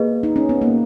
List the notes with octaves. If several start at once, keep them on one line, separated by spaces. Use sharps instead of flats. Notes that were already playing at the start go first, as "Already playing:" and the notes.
Already playing: A#3 G#4 B4 D#5
D#4
C#4
B3
A#3